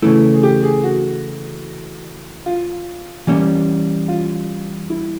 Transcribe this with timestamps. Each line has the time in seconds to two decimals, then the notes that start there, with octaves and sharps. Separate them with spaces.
0.02 C#3 E3 A3 E4
0.34 G#4
0.43 G4
0.63 G#4
0.84 F#4
2.46 F4
3.27 E3 G3 A#3 C#4
4.08 F4
4.90 E4